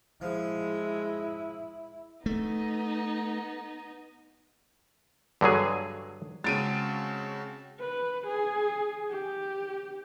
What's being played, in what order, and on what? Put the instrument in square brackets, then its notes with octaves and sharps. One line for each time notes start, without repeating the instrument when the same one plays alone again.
[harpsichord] F3 [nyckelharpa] G#3 [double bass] E4
[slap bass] A3 [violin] B3 D#4
[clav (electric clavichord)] G2 D3 F#3 G#4
[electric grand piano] C#3 G#3 [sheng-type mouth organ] C4 F#4 A5 [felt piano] A6 D7 D#7
[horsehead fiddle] B4
G#4
G4